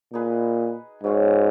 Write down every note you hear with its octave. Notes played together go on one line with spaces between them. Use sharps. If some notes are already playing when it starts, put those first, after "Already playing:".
A#2 D#4 G#4 B4 D#5
G#2 F#3 C#4 F4